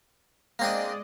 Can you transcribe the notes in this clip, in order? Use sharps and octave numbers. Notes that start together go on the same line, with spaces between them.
G#3 A#3 C4 D4 D5 D#5